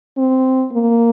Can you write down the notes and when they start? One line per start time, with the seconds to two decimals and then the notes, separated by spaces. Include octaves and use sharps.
0.17 C4
0.73 A#3